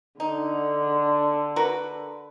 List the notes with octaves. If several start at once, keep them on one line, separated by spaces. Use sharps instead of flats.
D3 D#4
F#4 A#4 B4